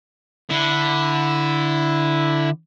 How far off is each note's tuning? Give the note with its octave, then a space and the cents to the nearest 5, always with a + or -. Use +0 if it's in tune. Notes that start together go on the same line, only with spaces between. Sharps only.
D3 +0 E4 +0